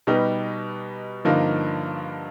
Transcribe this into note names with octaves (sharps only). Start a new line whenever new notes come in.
B2 G3 B3 D#4 G4
G2 D3 F3 A#3 D#4